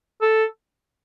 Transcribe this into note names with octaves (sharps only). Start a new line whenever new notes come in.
A4